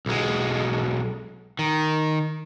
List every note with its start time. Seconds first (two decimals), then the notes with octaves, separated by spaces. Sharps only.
0.06 B1 G#3
1.59 D#3